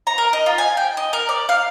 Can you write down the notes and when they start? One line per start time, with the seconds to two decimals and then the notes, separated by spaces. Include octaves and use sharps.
0.07 A#5
0.18 A#4
0.33 D#5
0.46 F4
0.58 G#5
0.77 G5
0.97 D#5
1.13 A#4
1.29 D5
1.49 F5